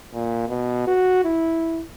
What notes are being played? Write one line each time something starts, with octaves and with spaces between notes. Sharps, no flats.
A#2
B2
F#4
E4